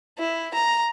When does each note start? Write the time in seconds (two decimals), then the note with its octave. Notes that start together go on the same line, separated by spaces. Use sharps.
0.18 E4
0.54 A#5